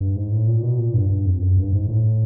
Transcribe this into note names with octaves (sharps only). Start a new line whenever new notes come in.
G2
G#2
A2
A#2
B2
A#2
G2
G2
F2
F#2
G2
G#2
A2